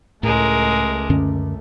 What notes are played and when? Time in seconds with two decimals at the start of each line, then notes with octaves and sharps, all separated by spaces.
0.23 C#2 A2 G#3 A3 A#4
1.10 F#2 D3 C#4